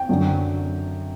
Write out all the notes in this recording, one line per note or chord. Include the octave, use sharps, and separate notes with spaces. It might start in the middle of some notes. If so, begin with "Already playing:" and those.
Already playing: G5
F#2 D3 F#3